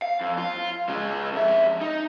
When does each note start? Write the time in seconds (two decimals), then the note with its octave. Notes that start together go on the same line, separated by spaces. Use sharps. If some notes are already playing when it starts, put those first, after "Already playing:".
0.02 F5
0.21 F2
0.38 F4
0.89 C#3 G#3
1.33 F2 E5
1.81 D#4